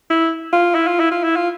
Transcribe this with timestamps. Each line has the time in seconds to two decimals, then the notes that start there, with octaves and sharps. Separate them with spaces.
0.10 E4
0.53 F4
0.75 E4
0.88 F4
1.00 E4
1.12 F4
1.24 E4
1.36 F4